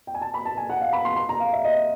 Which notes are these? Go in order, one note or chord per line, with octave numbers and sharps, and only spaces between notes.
G5
G#5
A5
B5
A5
G#5
F#5
F5
B5
C6
C6
A#5
F5
E5
D#5